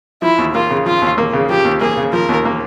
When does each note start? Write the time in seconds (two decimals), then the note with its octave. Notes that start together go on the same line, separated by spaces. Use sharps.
0.22 F3 E4
0.38 D#2
0.55 A#3 F4
0.70 C#3
0.86 F3 F4
1.02 D#2
1.18 A#3
1.33 C#3
1.50 F3 G4
1.65 D#2
1.81 A#3 G#4
1.97 C#3
2.13 F3 A#4
2.29 D#2
2.45 A#3